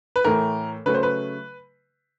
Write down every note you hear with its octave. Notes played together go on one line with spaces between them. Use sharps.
B4
A2 E3 A3 A#4
C#3 F#3 A3 B4
C5
B4